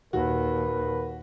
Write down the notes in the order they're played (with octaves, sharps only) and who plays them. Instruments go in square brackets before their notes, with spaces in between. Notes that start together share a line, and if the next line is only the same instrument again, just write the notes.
[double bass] D#2 A#2 [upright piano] F#4 [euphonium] A#4 [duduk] B4